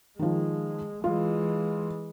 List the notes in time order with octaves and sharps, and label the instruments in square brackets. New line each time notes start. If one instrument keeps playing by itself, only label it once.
[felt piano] D#3 F3 [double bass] G#3
[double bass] E3 G#3 [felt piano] F4